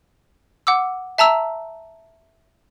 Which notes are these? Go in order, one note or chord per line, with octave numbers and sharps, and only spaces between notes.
F#5 D6 E6
E5 A5 A#5 E6